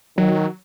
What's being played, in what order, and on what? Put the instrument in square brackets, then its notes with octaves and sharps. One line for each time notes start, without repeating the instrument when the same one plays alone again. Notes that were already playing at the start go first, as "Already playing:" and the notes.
[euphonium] D#3 [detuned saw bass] F#3